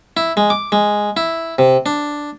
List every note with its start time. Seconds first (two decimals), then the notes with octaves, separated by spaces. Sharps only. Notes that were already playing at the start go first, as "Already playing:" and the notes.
0.17 E4
0.37 G#3
0.50 D6
0.72 G#3
1.17 E4
1.58 C3
1.86 D4